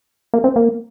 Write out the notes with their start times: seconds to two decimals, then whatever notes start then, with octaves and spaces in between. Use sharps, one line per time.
0.34 A#3
0.44 C4
0.56 A#3